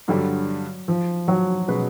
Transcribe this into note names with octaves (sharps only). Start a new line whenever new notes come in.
G2 D3 F#3 G3
F3
F#3
B2 G#3 C#4 F#4 B4